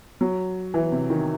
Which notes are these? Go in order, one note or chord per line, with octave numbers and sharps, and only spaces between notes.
F#3
E3
C3
D#3